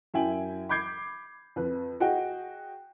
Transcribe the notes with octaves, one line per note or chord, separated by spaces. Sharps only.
F#2 E4 E5 G5 G#5 F#7
B5 D6 G6 G#6 C7
F2 B4
F#4 G#4 D#5 F#5 G5